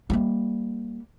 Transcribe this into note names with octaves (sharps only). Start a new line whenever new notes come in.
G3 A#3